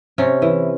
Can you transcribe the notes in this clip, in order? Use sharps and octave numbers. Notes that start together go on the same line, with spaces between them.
C3 C#4
E3